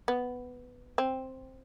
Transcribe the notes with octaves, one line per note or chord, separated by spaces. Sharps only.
B3
C4